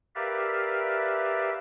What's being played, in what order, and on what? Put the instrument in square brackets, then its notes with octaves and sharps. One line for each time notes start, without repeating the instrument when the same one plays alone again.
[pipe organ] G4 A#4 B4 D5 E5 F5